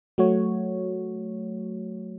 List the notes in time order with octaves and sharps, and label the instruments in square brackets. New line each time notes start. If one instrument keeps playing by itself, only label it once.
[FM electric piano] F#3 A3 F#4 C#5